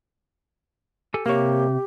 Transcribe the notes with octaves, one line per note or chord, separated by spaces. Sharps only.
G4 A4 G#5
C3 A#3 G4 C#5